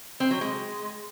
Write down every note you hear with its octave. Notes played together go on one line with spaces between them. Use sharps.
C4
F#3
G#3